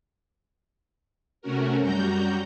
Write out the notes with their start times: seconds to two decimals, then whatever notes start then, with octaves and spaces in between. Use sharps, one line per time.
1.42 C3 A3 C#4 F#4 A#4
1.80 F#2 G3 F#4 A#5 G6